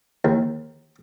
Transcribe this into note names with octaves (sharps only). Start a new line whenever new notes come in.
D#2